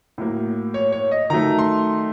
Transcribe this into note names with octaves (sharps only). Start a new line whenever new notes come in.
A2 F#3 A#3
C#5
C#5
D#5
D#3 F#3 A3 A#5
C6